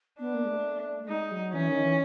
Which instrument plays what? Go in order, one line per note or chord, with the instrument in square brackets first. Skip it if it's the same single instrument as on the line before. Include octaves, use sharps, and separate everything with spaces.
[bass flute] B3 [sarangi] D4
[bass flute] A#3
G#3
A3
A3
[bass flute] G#3 [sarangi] D#4
[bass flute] F#3
[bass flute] E3 [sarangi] C#4
[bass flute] D#3
E3